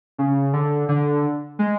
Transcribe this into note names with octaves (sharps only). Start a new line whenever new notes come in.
C#3
D3
D3
G#3